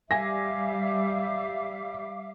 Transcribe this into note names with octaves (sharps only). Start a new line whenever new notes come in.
G3 E5 F5 G#5 D6 A#6